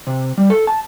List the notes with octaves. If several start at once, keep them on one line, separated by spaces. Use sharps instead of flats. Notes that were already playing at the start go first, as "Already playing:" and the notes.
C3
G3
A4
A5